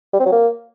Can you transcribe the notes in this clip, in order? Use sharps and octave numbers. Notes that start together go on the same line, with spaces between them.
G3
C4
F#3
A#3